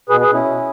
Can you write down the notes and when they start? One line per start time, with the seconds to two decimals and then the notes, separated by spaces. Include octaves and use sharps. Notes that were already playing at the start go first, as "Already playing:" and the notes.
0.09 B2 G#4 B4
0.20 G#4 B4
0.27 B2
0.32 C#4 E4
0.44 B2